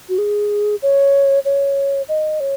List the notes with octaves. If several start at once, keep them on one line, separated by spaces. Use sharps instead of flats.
F#4
G#4
C#5
C#5
D#5
C#5